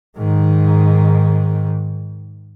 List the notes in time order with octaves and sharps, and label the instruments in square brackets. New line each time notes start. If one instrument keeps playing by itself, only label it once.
[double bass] G#2 D#3